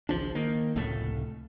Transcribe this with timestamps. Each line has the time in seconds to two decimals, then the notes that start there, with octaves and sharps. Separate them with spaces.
0.09 G#1 C#2 F3 D4
0.35 D#3 A#3
0.76 F1 C#2 A2 A3